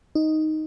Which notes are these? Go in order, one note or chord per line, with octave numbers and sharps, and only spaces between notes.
D#4